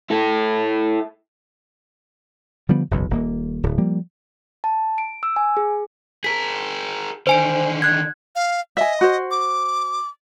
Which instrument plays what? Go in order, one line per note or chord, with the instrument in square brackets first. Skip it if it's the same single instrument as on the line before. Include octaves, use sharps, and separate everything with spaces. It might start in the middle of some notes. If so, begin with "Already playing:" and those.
[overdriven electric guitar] E4 A4
[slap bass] D3 F3 G3 B3
F#1 B1 E2
D#1 A#3
D1
F3 G3 A#3
[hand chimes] A5
D7
E6
G#5
G#4
[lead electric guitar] G#4 A#4 [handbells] B6
[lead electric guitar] D3 D#3 [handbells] C5 G#5 D7
[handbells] F#6 G#6
[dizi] F5
[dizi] D#5 [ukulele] E5 G#5
[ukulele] F#4 C5
[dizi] D6